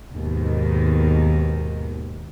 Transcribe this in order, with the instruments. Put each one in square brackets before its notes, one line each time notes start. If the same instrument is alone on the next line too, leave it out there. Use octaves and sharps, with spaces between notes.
[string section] D#2 G#2 B2 D#3